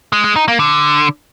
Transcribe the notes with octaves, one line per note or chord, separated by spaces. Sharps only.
G#3
G#3
D#4
A#3
D3